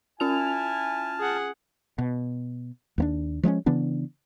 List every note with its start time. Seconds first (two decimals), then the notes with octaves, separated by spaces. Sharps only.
0.20 C#4 E4 F4 G#5 A5 F6 F7
1.19 G#4 F#5
1.98 B2
2.98 D#2 A#3 D4
3.43 F3 G#3 A3 C#4
3.66 C#3 E3 B3 D4